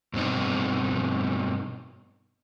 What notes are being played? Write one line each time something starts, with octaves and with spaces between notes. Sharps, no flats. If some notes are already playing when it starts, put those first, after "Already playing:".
G2 B2 C4 D#4